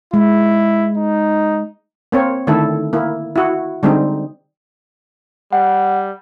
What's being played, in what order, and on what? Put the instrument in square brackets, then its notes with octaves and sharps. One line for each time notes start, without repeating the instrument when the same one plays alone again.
[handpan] G#3 [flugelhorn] E4
[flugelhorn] D#4
[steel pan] A#3 C4 C#5
D3 D#3 A3 E4 A4
A#3 E4
E4 F#4
D3 G3 G#3 C4 D#4
[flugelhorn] G3 [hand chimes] F#5